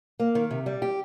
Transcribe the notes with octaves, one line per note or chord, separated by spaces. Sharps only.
A#3
D#3
C3
G3
G4